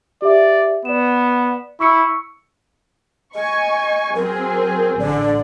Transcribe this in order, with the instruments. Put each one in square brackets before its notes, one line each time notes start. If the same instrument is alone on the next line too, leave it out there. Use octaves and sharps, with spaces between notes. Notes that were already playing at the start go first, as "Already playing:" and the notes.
[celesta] G4 E5 [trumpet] D5
[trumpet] B3 [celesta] D5 E7
[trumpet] E4 [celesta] C#6 E6 C#7
[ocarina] D#5 [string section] G#5 C#6
[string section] F#3 C4 G#4 [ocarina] A#4
[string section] A1 D3 [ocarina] D5